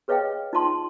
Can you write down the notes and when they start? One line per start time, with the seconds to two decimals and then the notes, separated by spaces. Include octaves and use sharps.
0.08 G#4 B4 C#5 D#5 F5 G5
0.53 D#4 F4 A5 C6